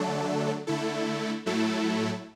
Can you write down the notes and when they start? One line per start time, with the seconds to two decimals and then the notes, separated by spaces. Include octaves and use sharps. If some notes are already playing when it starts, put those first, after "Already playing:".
Already playing: D3 F#3 A3 D4 A4
0.67 D3 A3 E4 A4
1.46 A2 F#3 A3 E4 A4